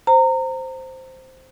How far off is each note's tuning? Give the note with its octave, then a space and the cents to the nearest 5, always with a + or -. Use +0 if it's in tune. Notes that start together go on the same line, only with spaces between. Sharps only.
C5 +0 A#5 -25